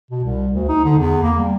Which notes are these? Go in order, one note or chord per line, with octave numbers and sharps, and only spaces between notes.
B2
C2
D2
D#4
D3
E2
A#3
G3